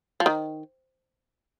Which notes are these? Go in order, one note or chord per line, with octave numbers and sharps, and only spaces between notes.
F3
D#3